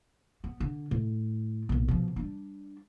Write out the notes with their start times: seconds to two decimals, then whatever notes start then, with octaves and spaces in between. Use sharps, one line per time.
0.44 B3
0.60 D3
0.91 A2
1.69 B1 A#2
1.88 B2 F3
2.16 G3 D4